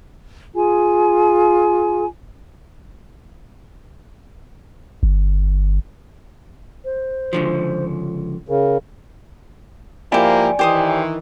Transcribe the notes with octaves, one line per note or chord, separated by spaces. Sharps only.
F4 G#4 G#5
G1
C5
C#2 D3 F3
C#3 A#4
G#2 F3 A#3 E4 G4 D5 G5 G#5
D#3 E3 G4 C5 D#6